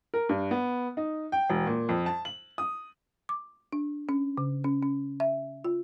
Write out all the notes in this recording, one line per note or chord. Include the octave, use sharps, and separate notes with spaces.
A#4
G2
B3
D#4
G5
E1
A#2
F2
A5
F#7
D#6
D6
D4
C#4
C#3
C#4
C#4
E5
F4